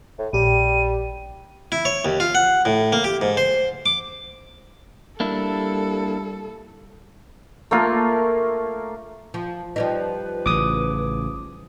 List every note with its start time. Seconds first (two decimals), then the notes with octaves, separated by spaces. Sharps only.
0.19 A2
0.33 A#1 G3 G4 D#7
1.72 E4
1.85 C#5
2.05 D#2
2.20 F4
2.35 F#5
2.65 A2
2.92 A#3
3.04 G4
3.21 G#2
3.37 C5
3.86 D6
5.20 G3 A#3 D4 E4 A4
7.71 A3 A#3 F4 A#4
9.34 F3
9.76 F3 G3 D#4 B4
10.46 A1 C#3 D6 D#6